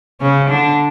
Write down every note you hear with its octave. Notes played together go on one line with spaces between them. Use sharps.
C#3 C#4
D3 D4